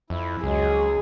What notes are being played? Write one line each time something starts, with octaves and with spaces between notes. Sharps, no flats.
F2 E4
C#2 F#3 G#3 G#4